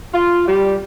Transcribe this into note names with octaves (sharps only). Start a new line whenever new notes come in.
F4
G3